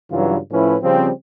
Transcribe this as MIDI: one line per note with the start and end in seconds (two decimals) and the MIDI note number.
0.10 0.37 43
0.10 0.37 49
0.10 0.37 52
0.10 0.37 54
0.10 0.37 65
0.51 0.75 45
0.51 0.75 53
0.51 0.75 61
0.51 0.75 64
0.51 0.75 71
0.81 1.09 49
0.81 1.09 53
0.81 1.09 55
0.81 1.09 60